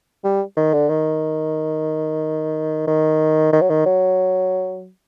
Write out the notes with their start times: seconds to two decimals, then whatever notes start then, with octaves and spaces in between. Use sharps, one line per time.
0.24 G3
0.57 D#3
0.74 D3
0.89 D#3
2.87 D#3
3.53 D#3
3.61 F#3
3.70 D#3
3.86 F#3